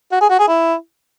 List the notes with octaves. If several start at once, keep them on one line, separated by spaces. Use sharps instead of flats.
F#4
G#4
F#4
G#4
E4